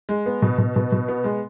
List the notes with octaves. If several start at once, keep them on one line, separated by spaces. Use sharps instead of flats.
G#3
B3
B2
B2
B2
B2
B3
G#3